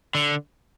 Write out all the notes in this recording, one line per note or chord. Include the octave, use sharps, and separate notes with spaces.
D3